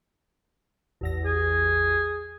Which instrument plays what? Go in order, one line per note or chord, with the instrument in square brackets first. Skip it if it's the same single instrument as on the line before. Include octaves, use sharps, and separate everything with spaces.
[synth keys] A1 E2 A#6
[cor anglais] G#4